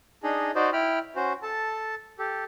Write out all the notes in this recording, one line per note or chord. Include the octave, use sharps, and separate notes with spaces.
D4 D#4 G#4 D#5
D#4 F#4 C5 D5 D#5
E4 G5 B5 F6
C#4 F#4 C5
A4 A5
G4 A4